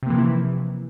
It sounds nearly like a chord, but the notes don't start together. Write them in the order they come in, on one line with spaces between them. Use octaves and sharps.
C3 A#3 E3 F3 E4